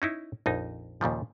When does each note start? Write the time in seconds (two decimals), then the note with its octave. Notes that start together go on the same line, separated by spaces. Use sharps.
0.02 C#4 D#4 E4
0.46 A#1 F2 D#4
1.01 D#2 A#2 C#3 F3